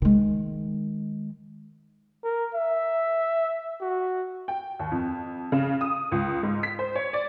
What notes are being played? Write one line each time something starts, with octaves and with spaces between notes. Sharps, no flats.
D#3 G#3
A#4
E5
F#4
G5
D#2
F2
C#3
D#6
C#2
G#2
B6
C5
C#5
D5